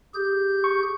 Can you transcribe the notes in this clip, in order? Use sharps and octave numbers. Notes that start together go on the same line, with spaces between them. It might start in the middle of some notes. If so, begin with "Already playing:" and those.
G4 G#4 G6
C#6